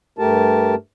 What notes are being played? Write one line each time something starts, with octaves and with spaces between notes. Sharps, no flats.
G2 A3 G4 A#4 A5